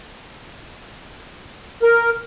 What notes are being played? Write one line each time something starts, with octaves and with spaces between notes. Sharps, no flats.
A#4